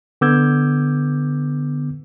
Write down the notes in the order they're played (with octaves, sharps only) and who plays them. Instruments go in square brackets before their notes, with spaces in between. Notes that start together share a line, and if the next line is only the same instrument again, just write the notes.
[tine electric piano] D3 B3 D6 E6 G6 G#6